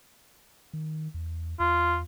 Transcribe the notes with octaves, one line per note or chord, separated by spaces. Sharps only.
D#3
E2
E2 F4